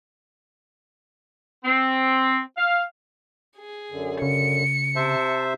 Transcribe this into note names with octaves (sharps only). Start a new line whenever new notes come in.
C4
F5
G#4
F#2 D3
C#3 C#7
C3 C5 E5 A5